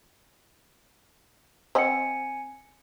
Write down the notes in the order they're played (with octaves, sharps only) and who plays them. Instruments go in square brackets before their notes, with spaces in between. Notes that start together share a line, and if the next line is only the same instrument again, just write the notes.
[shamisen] C4 D#5 F#5 [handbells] G#5 C#7